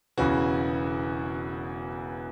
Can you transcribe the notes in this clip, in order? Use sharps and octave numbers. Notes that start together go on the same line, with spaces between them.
E1 E2 C#3 E3 F#4